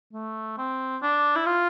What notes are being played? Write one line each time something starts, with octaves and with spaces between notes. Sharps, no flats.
A3
C4
D4
E4
F4